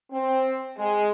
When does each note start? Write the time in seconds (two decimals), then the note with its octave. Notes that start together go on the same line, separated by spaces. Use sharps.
0.12 C4
0.78 G#3